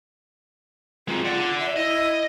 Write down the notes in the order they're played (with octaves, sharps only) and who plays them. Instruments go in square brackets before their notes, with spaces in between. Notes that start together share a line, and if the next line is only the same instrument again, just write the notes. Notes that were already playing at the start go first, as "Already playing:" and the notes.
[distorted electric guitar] G#3 C4 [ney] F4
[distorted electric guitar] D5 F#5
[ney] E5
[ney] E4 [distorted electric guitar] D#5